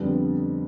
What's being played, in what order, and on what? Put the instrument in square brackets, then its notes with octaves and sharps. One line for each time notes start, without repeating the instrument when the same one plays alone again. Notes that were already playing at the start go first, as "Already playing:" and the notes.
Already playing: [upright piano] F2 D3 G3 B3